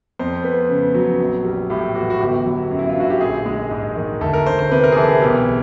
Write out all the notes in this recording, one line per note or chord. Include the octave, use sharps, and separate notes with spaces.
F2 C5
B3
C#3
F#3
A#1
G3
A2 G4
E3 F#4
F#4
G1 G4
F#3
F#2
E4
F4
D3 F#4
G4
A#1 G#4
G#3
G#2
D#3
D2 A4
A#4
D2 C5
C5
C3 B4
A#4
G#4
E3 A4
G#4
B1 G4